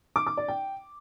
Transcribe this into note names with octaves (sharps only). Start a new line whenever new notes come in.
D6
D6
D5
G5